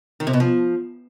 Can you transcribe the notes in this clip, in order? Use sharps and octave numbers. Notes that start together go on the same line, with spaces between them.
D#3
C3
B2
F3